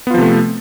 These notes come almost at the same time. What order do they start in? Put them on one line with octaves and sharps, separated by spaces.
B3 F4 F3 C3 A3